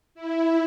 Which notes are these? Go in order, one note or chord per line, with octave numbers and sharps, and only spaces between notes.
E4